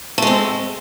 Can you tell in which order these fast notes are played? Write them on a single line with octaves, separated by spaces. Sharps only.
A3 G#3 C4